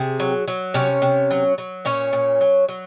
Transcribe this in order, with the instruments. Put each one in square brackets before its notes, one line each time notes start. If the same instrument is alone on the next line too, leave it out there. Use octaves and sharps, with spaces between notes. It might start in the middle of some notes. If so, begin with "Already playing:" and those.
Already playing: [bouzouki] C3 G#4
F#3
F#3
C3 C#4 C#5
C3
F#3
F#3
A#2 C#4 C#5
A#2
F#3
F#3